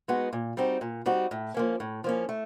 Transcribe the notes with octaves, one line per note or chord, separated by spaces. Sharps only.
G#3 B3 D#4 F#4
A#2
G3 C4 D#4 F#4
A#2
G3 C4 D#4 F#4
A2
F3 A#3 C#4
A2
F3 A#3 C#4
A3